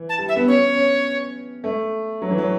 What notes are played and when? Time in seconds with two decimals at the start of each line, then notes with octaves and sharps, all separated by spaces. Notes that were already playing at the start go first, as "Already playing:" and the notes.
Already playing: E3
0.09 A5
0.18 G3
0.28 E5
0.36 B3
0.48 C#4 C#5
0.76 C#4
1.64 A3
2.22 F#3
2.31 E3
2.38 F#3